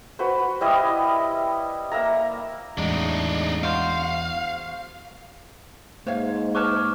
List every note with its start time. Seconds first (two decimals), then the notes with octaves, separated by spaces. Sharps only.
0.19 F#4 B4 C5
0.61 G3 E4 D#5 D#6
1.91 A#3 E5 A#5
2.78 E2 A2 G#3 D4 D#4
3.63 F#4 C5 F5
6.07 G#2 A#3 C5 C#5 F5
6.55 B4 C#5 A5 C#6 D6 F6